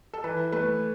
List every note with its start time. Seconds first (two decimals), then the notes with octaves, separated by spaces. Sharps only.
0.13 A4
0.24 E3 B4
0.52 A3 B4